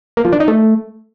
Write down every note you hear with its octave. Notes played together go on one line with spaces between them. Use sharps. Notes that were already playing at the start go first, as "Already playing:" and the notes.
A#3
F3
D4
D#4
A3